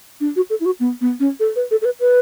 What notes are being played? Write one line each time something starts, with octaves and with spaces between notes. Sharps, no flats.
D4
F#4
A4
E4
F#4
B3
B3
C#4
A4
B4
A4
A4
B4
B4